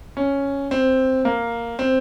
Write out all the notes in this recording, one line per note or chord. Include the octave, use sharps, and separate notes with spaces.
C#4
C4
A#3
C4